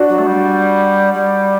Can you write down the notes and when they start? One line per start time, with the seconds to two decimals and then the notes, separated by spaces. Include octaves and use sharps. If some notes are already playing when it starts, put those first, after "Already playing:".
Already playing: D4 F#4
0.09 F#3
0.18 A3
0.26 G3
1.13 G3